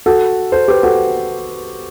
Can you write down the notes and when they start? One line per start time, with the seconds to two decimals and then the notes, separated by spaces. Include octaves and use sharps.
0.06 F#4 A4
0.52 A4 C5
0.68 G4 B4
0.83 F#4 A4